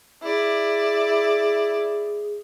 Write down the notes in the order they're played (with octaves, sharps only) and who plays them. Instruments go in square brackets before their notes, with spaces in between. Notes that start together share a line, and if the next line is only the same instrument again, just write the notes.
[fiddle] E4 D5 [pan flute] G#4